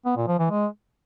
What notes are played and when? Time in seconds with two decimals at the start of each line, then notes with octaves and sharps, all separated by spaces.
0.05 B3
0.17 A#2
0.28 F3
0.39 E3
0.50 G#3